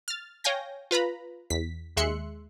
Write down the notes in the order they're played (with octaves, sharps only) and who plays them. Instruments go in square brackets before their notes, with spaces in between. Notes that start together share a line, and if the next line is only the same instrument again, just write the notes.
[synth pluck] F6 A6
C#5 F5 G5 G#5 G6 A#6
F4 B4 A#5 B5
E2 B6
D#2 G#3 E5 C6 F#6 C#7